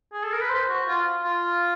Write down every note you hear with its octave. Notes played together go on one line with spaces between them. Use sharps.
G#4
A4
A#4
B4
C5
F#4
F4
F4